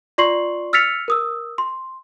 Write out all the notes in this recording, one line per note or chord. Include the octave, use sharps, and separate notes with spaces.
F4 D5 C6 C#6 C7 F#7
E6 F6 A6 B6 C#7 F7
A#4 D#6 E6
C6